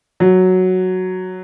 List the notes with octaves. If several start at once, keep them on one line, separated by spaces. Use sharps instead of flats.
F#3